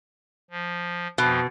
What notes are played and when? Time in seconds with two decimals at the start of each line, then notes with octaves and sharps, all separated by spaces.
0.50 F3
1.18 F2 B2 F3